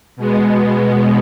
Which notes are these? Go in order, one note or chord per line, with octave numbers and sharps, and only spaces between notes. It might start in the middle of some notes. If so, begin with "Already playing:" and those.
B2 G#3 B3